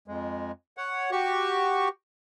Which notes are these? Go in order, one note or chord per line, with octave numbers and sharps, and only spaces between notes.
F2 G#3
C#5 F#5
F#4 G4 C#6